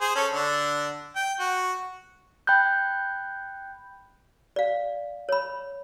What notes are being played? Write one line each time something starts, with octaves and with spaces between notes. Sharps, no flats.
G#4 C5 G#5
C#4 A4 C#5
D3 D4
G5
F#4
G5 B5 F#6 G6
D5 F5
C#5 B5